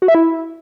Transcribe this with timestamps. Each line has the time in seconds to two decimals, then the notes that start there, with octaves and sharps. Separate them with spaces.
0.02 F#4
0.08 E5
0.15 E4